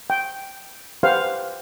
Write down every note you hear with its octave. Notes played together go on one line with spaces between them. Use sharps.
G5
G4 B4 C5 F5 F#5